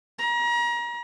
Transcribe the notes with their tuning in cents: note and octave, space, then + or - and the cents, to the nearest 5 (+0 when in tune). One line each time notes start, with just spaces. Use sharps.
A#5 +35